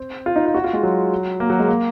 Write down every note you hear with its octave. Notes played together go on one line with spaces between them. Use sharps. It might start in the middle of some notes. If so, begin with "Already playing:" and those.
Already playing: C4
F4
D#4
F4
F#4
F4
G#3
F#3
A#3
F#3
G#3
A#3